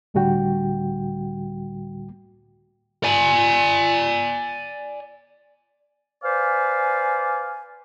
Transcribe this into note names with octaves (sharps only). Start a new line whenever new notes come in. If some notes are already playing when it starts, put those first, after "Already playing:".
C#2 A2 D3 G3 F#4 G5
D5 G#5
B4 C5 D5 F5 G#5